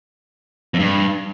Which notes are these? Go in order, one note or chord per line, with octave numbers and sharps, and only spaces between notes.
F2
G2